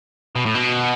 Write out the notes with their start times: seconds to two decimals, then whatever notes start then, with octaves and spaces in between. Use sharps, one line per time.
0.36 B2
0.46 A2
0.55 B2